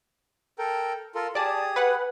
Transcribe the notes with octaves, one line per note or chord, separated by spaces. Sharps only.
A4 A#4 G5
F4 A4 A#4
G4 G#4 D5 A5 D#6
B4 F#5